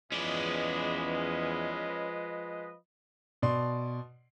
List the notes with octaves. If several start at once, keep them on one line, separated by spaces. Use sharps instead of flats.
E2 F3 G#3 C#4 B4 D5 D#5
B2 D5 C6